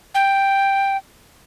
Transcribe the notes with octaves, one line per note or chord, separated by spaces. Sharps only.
G5